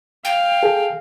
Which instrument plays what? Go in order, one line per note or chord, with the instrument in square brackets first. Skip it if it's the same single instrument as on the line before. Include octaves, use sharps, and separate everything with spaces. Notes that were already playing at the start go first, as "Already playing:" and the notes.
[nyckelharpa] F5 [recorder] G5
[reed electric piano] G#4 A4